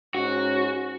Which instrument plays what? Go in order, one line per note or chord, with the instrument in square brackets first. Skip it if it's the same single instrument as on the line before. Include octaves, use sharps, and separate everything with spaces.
[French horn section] G#2 C#4 [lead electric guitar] F#4